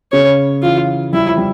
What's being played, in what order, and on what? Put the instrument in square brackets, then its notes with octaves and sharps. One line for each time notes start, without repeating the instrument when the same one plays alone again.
[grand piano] C#3 [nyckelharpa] C#5
[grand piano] E3 [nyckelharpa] F4
[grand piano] G3 [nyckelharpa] E4
[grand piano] F3
G3